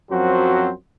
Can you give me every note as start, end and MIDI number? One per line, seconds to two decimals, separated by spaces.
0.11 0.71 42
0.11 0.71 53
0.11 0.71 54
0.11 0.71 60
0.11 0.71 66
0.11 0.71 72